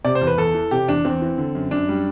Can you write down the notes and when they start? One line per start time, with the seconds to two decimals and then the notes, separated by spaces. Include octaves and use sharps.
0.05 C3 D5
0.15 C5
0.21 E2
0.27 B4
0.38 E2 A4
0.54 E3
0.71 C3 G4
0.88 E2 D4
1.05 E2 C4
1.22 E3
1.38 D3
1.55 F#2
1.71 F#2 D4
1.89 G3